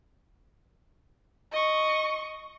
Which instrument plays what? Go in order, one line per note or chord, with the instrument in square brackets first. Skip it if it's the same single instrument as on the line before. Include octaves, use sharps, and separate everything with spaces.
[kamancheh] D#5 C#6